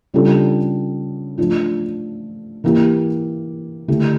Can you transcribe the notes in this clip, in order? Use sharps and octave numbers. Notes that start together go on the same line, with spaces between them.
C#3 G3 D4 F4 A4
F3 A3 D4 F4
E3 A#3 E4 G4
D3 A3 E4 G4